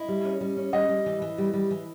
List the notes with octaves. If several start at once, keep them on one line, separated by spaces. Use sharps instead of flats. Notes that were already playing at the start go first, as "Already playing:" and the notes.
Already playing: E4 D#5
G3
C#4
G3
C#4
G3 D#5
G3
E3
E3
G3
G3
E3